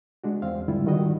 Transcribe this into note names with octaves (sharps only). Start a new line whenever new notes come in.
G#3 D4 F#4
E2 C4 F5
G#2 D3 G3 E4 F4
D#3 G3 F#4 D#5